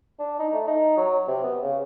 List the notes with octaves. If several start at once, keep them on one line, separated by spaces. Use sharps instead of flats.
D4
D#4
A3
D#4
F#3
C3
B3
C#3